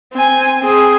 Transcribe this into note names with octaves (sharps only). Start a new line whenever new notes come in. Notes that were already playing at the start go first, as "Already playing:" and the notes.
C4 G#5
C4 G#4